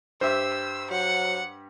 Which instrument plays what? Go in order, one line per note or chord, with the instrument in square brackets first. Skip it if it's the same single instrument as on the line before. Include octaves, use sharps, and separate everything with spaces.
[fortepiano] G2 G4 E5 [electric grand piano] C5 [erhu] E6
[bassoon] F#3 [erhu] F#5